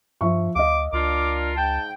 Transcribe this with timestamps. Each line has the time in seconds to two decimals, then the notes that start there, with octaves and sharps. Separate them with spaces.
0.21 G2 F3 E5 C#6
0.55 D2 D#5 F5 D6
0.92 C#2 D4 F4 A#4 D6
1.56 G#2 G5 A5